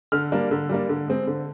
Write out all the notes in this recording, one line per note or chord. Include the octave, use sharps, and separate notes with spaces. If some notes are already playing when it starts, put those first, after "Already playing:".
D3 F6
G3 A#3 D4
D3
G3 A#3 D4
D3
G#3 C4
D3